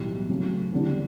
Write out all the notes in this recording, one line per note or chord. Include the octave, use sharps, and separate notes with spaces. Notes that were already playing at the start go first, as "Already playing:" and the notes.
Already playing: B1 A2 E3 G3
C#3 F#3 A3
E2 D3 G3 D4